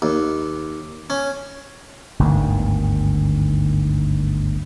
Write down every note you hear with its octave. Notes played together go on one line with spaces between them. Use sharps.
D#2
C#4
G1 D2 G#2 D#3